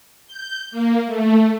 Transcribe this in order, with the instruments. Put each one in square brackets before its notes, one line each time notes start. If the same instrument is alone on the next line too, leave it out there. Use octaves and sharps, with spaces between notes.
[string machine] G6
A#3
A3